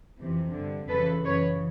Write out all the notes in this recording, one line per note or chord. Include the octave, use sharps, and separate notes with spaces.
F2 C3 E3
G2 D3
F2 C#3 E3 A4 B4
F#2 C#3 E3 B4 C#5